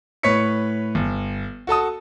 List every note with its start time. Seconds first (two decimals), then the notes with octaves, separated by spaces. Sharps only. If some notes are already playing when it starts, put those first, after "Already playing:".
0.23 A2 B4 C#5 C#6 B6 C#7
0.95 G1
1.67 F#4 A4 A5 D#6